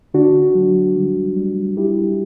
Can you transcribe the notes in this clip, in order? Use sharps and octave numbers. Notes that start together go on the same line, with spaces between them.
D3 D4 F#4
F#3
G3
G3
G3 E4 G4